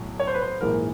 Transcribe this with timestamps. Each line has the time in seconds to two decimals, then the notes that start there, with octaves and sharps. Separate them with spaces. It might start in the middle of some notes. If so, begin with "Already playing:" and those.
Already playing: B1 A2 F#3
0.20 C#5
0.27 C5
0.34 B4
0.42 C5
0.61 A#1 G#2 E3 A#4